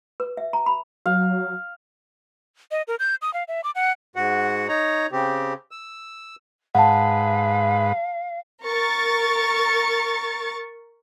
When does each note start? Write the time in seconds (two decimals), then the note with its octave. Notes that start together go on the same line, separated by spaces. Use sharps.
0.20 B4
0.37 E5
0.53 A#5
0.66 B5
1.06 F#3 F5
2.71 D#5
2.88 A#4
2.99 G6
3.22 D#6
3.34 F5
3.48 E5
3.64 D6
3.75 F#5
4.16 G#2 F#4 F#5
4.68 D#4 C#5 A#5
5.12 C#3 C4 G4
5.71 E6
6.75 G#2 B4 F5 F#5 A5
8.65 A#4 C#6 A6